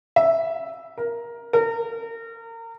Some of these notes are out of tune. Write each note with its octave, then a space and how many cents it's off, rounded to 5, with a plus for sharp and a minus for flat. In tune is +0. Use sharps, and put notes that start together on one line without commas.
E5 +0
A#4 +10
A#4 -30